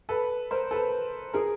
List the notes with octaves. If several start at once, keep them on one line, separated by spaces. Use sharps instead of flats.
A4 B4
A#4 C5
A4 B4
G#4 A#4